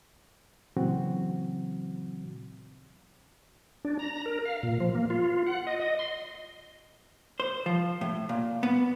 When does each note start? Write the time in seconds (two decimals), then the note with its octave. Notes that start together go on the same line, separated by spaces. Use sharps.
0.77 A#2 C#3 E3 F#3 C4 F#4
3.85 D4
3.99 A#5
4.26 A#4
4.45 F5
4.63 A#2
4.80 F3
4.95 A#3
5.10 F4
5.46 F#5
5.67 D#5
5.80 D#5
5.99 C6
7.40 C5
7.66 F3
8.01 A2
8.29 A#2
8.63 B3